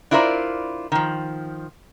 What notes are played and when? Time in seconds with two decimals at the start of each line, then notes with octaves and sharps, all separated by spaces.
0.11 D4 E4 F4 A#4 C5 D5
0.92 D#3 F3